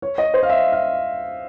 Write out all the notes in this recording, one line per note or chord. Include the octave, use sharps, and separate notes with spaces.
C#5
D#5
C5
F5
E5
F5